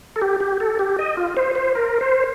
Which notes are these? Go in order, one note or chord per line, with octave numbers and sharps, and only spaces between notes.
A4
G4
G4
A4
G4
D#5
F4
C5
C5
A#4
C5